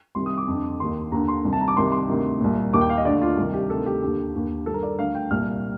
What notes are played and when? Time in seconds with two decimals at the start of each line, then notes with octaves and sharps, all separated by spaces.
0.15 C2 C3 D#3 C6
0.26 D#6
0.37 D6
0.48 F2 D3
0.80 D#2 D#3 C6
1.12 D#2 D3 A#5
1.28 C6
1.45 C2 C3 D#3
1.53 A5
1.61 A#5
1.68 D6
1.76 C2 C3 D#3 C6
1.92 C6
2.08 D2 C3 D#3
2.41 C2 A#2
2.73 D#2 D#3 D6
2.81 G5
2.90 F5
2.97 D#5
3.05 D2 D3 D5
3.22 F4
3.37 C2 C3 D#3
3.54 G4
3.69 D2 C3 D#3 A4
3.86 G4
4.02 D#2 D3 G4
4.34 D#2 D3
4.66 G2 D#3 A4
4.74 A#4
4.83 D5
4.98 D2 D3 F5
5.15 G5
5.31 C2 A#2 F6